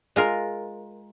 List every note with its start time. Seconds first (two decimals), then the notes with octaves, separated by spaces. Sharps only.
0.16 G#3 F4 A#4